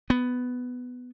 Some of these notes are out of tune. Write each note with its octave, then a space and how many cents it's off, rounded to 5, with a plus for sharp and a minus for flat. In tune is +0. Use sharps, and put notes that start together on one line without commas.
B3 +10